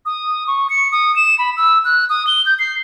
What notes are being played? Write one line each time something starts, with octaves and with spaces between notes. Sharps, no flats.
D#6
C#6
C#7
D#6
E7
B5
E6
F#6
D#6
G7
G6
C7